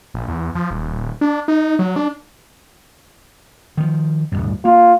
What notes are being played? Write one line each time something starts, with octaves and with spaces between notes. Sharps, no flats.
A#1
E2
F3
D#1
D4
D#4
F#3
D4
D#3 F3
D1 B1 G2
A#3 F4